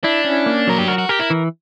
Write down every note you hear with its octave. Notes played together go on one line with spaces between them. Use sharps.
D4 E4
C#4
A#3
F#3 A#4
G4
F#4 A#4
F#4
G4 A#4
E4
E3